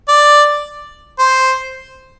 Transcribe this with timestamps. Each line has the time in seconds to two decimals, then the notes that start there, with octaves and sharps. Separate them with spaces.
0.08 D5
1.19 C5